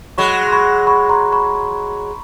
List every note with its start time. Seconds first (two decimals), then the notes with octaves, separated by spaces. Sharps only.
0.18 F#3 G#3 B5 C#6
0.47 C6
0.53 B5 C#6
0.87 B5 C#6
1.09 A#5 C6
1.32 B5 C#6